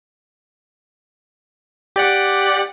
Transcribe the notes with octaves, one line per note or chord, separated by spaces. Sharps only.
G4 D5 F#5